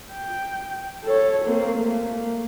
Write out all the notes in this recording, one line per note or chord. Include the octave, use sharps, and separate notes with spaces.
G5
A4 C#5
A#3 C4
A3 A#3